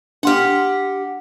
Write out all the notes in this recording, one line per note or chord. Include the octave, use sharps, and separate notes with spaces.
D4 G4 F#5 C6 F6